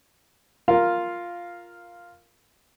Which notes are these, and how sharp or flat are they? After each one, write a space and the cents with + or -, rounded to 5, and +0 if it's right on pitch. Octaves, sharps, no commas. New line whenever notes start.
F4 +0 A#4 +0 F5 +0